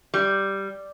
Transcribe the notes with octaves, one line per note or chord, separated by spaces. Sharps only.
G3